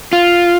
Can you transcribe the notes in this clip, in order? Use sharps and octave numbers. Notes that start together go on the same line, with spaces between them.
F4